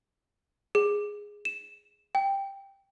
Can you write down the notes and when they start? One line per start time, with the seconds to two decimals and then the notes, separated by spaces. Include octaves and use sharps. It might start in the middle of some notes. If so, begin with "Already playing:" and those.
0.75 G#4
1.45 E7
2.15 G5